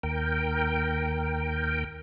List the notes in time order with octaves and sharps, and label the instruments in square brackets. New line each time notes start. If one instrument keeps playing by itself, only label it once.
[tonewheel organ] D#2 A#4 G5